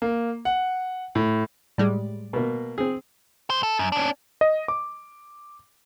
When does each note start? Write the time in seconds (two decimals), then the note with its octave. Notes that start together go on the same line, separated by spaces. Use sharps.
0.02 A#3
0.45 F#5
1.15 A2
1.78 A2 G3 G#3 D5
2.33 B2 A#3
2.78 C4 G#4
3.50 D2 C5
3.63 A4
3.79 F#2
3.92 C#4 D4
4.41 D#5
4.68 D6